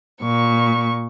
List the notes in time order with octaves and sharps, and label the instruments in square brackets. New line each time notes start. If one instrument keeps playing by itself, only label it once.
[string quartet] A#2 C#6